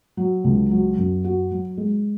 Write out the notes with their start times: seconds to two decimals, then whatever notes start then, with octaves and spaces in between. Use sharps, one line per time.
0.17 F#3
0.44 C#2
0.71 F#3
0.97 F#2
1.24 F#4
1.51 F#3
1.77 G#3